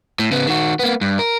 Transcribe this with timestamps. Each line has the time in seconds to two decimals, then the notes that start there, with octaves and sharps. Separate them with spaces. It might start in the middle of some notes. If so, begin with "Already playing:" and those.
0.19 A2
0.31 C#3 B3
0.47 D#3 F#4
0.79 A#3 B3
1.01 G2
1.19 A#4